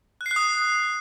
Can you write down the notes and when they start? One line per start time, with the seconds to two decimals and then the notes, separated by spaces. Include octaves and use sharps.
0.21 F#6
0.26 C7
0.31 F#6
0.36 D#6